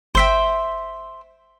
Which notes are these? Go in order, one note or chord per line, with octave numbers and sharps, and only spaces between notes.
G1 C5 E5 G5 B6